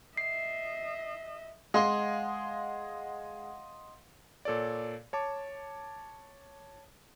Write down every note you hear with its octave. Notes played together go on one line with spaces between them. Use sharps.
D#5 E5 C7
G#3 D#5 F5 F#5 C6
A#2 A4 C#5 D5
C#5 A5 D6